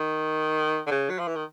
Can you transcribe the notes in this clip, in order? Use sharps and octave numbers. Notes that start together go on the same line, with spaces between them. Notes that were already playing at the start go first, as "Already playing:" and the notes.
Already playing: D#3
D3
C#3
F#3
F3
E3
D#3